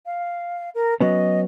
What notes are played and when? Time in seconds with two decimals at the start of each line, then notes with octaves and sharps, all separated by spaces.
0.06 F5
0.74 A#4
1.01 F#3 B3 C#4 D#5